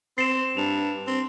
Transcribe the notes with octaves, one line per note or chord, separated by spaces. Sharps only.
C4 C7 E7
G2 F7
C4